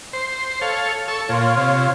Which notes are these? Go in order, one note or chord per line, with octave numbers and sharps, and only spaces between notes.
C5
A4 C#5 F5
A4 C#6 E6
A#2 F4 C#5
C3